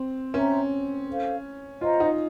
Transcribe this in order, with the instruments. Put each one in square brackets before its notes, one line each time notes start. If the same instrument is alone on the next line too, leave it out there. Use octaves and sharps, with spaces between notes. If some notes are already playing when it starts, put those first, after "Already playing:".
Already playing: [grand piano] C4
[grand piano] C#4 [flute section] C5 E5 G5 A#5
[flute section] A4 C5 F5
[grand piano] F4 [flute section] C5 D#5 F#5 A#5
[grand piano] D#4